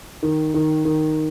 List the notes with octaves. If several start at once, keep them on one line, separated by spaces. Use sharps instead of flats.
D#3
D#3
D#3